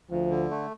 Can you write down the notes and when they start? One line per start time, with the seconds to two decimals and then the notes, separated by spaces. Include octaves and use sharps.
0.10 D2 F3
0.31 D3
0.51 A3